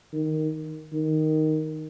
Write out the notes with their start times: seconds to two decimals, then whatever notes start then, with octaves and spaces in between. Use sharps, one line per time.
0.12 D#3
0.92 D#3